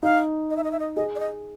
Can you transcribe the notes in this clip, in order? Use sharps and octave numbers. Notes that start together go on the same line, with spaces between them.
D#4 F5
D#5
E5
D#5
E5
D#5
G#4 D#5
D5
D#5